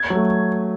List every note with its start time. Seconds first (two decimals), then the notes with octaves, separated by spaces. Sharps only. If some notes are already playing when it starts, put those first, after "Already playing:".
Already playing: G#6
0.10 F#3 A3